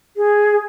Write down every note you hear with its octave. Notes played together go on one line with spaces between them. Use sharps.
G#4